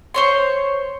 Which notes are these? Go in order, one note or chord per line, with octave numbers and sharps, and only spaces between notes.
C5 C#5 C6